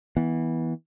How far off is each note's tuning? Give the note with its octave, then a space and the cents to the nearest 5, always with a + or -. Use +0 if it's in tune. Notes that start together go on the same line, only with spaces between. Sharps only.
E3 -20 B3 -20